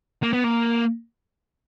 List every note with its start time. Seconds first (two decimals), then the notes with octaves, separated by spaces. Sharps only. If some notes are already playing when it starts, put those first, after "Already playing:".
0.23 A#3
0.33 B3
0.44 A#3